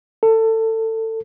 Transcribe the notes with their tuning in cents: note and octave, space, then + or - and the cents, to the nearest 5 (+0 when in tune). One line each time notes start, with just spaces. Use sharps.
A4 +25